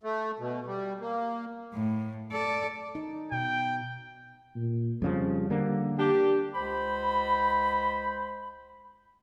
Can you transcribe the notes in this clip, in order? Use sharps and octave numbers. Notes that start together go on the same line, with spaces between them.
A3
B2
G3
A#3
A2
A4 D5
D#4
B2 G5
A#2
F2 C#3 F3 G3
D3 A#3
D4 G4
C#2 C5 B5